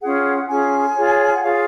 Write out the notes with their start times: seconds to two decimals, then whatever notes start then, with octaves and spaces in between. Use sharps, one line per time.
0.01 C#4 F4 G#4 F#5
0.48 C#4 F4 G#4 G#5
0.95 F4 G#4 C#5
1.36 F#5
1.43 F4 G#4 C#5 F5